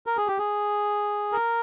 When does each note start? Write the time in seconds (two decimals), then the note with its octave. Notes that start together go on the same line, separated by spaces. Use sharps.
0.06 A#4
0.17 G#4
0.28 G4
0.38 G#4
1.32 A#4